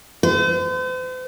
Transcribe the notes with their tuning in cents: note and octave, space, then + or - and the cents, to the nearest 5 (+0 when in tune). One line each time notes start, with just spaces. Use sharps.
C5 -45